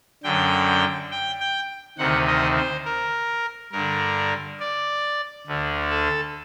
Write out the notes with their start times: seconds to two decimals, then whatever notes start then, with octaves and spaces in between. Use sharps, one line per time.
0.24 F#2 D3 G5
1.11 G5
1.40 G5
1.98 D2 C3 D#3 F#5
2.27 D#5
2.56 C5
2.85 A#4
3.72 G2 D3 A#4
4.60 D5
5.46 D2 D3
5.90 A4